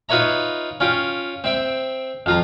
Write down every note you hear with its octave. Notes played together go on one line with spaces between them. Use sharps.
D#4 F4 B4 C#5 E5 A#5
C#4 F4 G5
C4 E5 G5
F2 F4 A#5